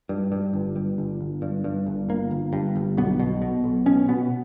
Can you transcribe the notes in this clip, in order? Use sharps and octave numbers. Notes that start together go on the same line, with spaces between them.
G2
G2
G1
G2
G1
G1
G2
G2
G1
G1 A#3
G1
G2
G1
B1 B3
B2
B2
B1
B2 C#4
B2 B3